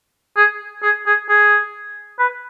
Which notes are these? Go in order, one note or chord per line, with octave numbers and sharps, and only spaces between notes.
G#4
G#4
G#4
G#4
B4